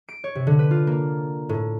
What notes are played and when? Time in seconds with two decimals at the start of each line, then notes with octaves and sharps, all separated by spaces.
0.09 D7
0.24 C#5
0.35 C3
0.47 D3
0.59 B4
0.71 F4
0.87 A#3
1.49 A2